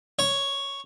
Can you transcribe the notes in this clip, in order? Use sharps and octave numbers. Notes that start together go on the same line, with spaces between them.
C#5